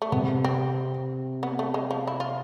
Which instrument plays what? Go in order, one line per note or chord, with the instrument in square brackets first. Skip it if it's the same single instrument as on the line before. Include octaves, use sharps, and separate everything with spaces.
[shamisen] A3
[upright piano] C3 [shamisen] B3
[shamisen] C4
B3
A3
G#3
F3
E4
F4